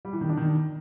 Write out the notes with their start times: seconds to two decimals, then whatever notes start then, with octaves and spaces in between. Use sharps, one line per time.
0.05 G3
0.13 E3
0.21 D#3
0.29 D4
0.37 D#3